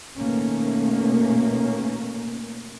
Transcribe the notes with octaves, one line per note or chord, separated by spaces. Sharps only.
B2 D#3 A3 A#3 C#4